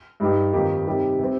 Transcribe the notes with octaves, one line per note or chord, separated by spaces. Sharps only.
G2 G3 D#4 G4
F2 D#3 A#3 D#4 G4
C3 G3 D#4 G4
C3 G3 C4